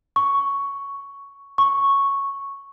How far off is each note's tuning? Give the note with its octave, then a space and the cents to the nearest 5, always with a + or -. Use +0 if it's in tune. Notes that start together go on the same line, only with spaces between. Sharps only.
C#6 +5
C#6 -5